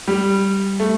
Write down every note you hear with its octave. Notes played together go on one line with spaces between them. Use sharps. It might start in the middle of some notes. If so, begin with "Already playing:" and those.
G3
A3